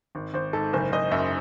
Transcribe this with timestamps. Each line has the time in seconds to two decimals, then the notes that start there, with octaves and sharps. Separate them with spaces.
0.15 G#1
0.34 G#1 C5
0.53 G#2 A4
0.73 F#1 C5
0.92 F#1 D#5
1.11 F#2 E5